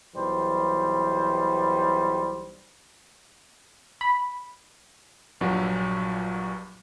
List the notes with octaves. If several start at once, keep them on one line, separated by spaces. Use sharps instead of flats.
B1 E3 G3 C5
B5
A#1 G2 A#2 F#3 F#5